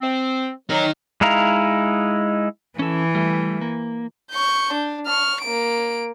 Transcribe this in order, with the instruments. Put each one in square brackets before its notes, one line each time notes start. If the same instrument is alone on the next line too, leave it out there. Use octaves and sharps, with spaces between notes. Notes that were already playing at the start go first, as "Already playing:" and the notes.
[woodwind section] C4
[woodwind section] D#3 E3 F#3 [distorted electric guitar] D#4 A#4
[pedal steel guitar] G#3 D#4 E4 F5 A#5
[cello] E3 [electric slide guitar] C#4 A4
[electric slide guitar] G3 A3
A#3
[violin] C#6 G6
D4
C#6 F6
A#3 D7